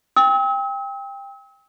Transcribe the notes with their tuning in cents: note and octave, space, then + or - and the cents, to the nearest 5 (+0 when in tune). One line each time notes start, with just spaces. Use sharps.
G5 +20 E6 -45